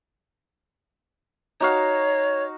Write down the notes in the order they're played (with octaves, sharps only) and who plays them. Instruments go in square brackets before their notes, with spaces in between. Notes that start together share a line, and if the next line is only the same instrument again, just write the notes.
[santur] D#4 F#4 F5 [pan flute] C#5